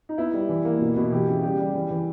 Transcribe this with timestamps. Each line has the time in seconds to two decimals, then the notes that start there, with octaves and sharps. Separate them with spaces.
0.09 D#4
0.18 B3 E4
0.34 G3
0.49 E3
0.65 A#3
0.81 B2
0.96 B2
1.12 E3 G4
1.28 C#3
1.43 G3 G4
1.59 G3
1.74 E3
1.91 E3